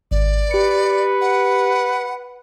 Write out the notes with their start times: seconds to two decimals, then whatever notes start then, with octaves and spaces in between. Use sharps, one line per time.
0.11 G#1 D5
0.51 G4 B4 C#7
1.21 F#5